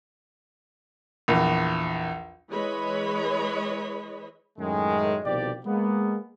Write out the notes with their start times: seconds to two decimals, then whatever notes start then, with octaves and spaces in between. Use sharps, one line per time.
1.28 A#1 E2
2.50 E3 G#3 B4 C#5 D#5 B5
4.59 F#2 A2 D#3 G#3
5.25 C2 B2 D#3 F3 G4 D5
5.65 G#3 A#3 B3